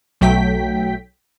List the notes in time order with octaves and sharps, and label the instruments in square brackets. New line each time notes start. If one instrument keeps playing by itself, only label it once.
[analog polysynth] B1 F#3 A3 G5 B6